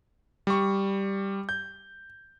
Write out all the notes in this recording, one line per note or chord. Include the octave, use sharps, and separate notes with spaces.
G3 C#6
G6